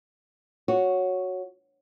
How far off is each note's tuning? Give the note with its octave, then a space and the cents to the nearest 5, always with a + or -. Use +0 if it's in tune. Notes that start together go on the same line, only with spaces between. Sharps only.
F#4 -5 C#5 +0